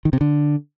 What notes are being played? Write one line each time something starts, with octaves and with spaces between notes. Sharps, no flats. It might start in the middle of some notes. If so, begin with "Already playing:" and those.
D#3
C3
D3